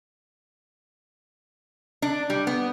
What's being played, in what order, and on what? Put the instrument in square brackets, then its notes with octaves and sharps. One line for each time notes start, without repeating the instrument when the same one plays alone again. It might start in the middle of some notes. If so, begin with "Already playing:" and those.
[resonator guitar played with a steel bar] D4
G3
B3